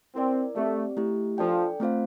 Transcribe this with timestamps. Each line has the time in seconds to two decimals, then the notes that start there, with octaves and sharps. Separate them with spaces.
0.15 C4 E4 A#4 D5
0.56 A3 C4 G4 D5
0.97 A3 E4 G4
1.38 F3 D4 A4 D5 G5
1.80 A3 C4 F4 C5 F5